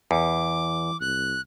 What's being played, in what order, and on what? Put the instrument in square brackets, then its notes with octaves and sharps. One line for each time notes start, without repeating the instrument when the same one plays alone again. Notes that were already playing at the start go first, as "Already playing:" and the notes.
[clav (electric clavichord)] E2 [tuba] E3 [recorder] D6
[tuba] C2 [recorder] F#6